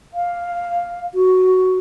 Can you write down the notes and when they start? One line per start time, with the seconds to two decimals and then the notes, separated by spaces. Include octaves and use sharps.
0.14 F5
1.14 F#4